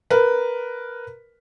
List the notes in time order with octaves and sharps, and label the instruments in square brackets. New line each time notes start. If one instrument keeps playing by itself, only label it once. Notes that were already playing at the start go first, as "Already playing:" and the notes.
[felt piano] A#4 B4